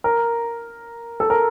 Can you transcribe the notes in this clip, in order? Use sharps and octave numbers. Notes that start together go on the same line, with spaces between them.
A#4
A4
A#4